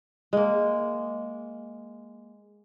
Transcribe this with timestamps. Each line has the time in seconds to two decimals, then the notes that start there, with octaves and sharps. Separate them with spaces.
0.33 G#3 A#3